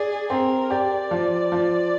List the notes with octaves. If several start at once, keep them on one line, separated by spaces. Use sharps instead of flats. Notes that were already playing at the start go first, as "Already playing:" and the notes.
Already playing: G#4 D5
C4 A#4
G4 D5
F3
F3